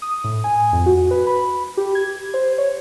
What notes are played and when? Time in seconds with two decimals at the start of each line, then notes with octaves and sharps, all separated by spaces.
0.02 D#6
0.24 A2
0.44 G#5
0.72 F2
0.86 F#4
1.11 B4
1.27 B5
1.77 G4
1.95 G#6
2.34 C5
2.58 C#5